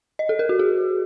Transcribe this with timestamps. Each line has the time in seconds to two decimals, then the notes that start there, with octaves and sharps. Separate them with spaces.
0.19 D#5
0.29 A4
0.39 A#4
0.49 F#4
0.59 G#4